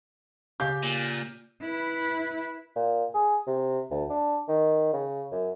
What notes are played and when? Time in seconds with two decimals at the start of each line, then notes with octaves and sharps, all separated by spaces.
0.60 C#3 G4 F5 G6
0.83 A#2
1.63 E4 B4
2.76 A#2
3.14 G#4
3.47 C3
3.91 D2
4.10 D4
4.48 D#3
4.93 C#3
5.31 F#2